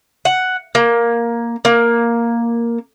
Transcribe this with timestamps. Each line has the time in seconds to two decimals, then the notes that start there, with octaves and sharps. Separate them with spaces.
0.25 F#5
0.75 A#3
1.65 A#3